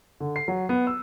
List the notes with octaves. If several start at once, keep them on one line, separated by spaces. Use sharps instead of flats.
D3
C7
F#3
B3
E6